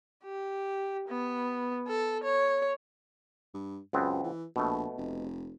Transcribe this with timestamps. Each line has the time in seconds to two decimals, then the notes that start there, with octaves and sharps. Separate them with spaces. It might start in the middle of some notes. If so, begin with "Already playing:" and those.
0.25 G4
1.08 B3
1.88 A4
2.24 C#5
3.54 G2
3.93 C#2 F#2 B3 C4
4.23 E3
4.56 A#1 B2 A3
4.97 F1